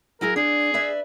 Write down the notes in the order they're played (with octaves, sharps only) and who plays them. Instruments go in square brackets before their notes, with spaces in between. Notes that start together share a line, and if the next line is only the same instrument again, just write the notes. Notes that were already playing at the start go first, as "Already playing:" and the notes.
[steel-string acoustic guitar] F#3 E4 G#4 [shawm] A#4
[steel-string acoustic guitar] B3 D4 [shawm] G#4
[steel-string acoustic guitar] B4 D5 E5